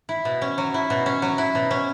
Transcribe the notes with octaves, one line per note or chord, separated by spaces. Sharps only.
E4
B2
C#4
F#3
E4
B2
C#4
F#3
E4
B2
C#4